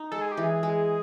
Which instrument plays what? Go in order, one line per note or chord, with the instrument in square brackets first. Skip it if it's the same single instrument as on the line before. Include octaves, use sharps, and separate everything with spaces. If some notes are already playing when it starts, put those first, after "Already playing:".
Already playing: [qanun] D#4
[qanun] G#3 [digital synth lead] A4
[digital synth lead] G#4
G4
[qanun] E3
[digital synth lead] G#4
[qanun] G#3